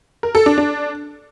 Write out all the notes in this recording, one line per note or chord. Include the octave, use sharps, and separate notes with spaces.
A#4
A4
D4
D4